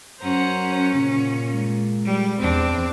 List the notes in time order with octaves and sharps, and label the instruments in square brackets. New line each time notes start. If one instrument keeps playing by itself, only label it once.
[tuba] F#2 [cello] C#4 [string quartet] C5 F#5 A#5
[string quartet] A#2 [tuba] C#3
[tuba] G#3
[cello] G3
[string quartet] E2 [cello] C4 D4